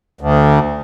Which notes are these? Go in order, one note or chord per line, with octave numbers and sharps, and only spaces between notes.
D2